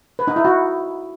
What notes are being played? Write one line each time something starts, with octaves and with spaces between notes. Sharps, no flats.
B4
D#4
E4
F#4